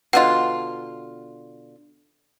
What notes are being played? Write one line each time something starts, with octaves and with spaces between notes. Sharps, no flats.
B2 D3 F4 D#5 F#5